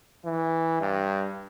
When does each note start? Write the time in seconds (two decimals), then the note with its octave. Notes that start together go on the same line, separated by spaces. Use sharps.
0.25 E3
0.81 G2